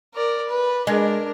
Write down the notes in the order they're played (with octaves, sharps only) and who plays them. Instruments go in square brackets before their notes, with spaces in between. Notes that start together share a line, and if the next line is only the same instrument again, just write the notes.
[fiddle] A#4 D5
B4
[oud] G#3 [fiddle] D4 A#4